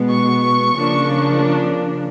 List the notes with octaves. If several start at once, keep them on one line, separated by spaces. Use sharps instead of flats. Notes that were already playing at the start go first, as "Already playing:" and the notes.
Already playing: B2 G#3 B3
C#6
C#3 F3 A#3 D4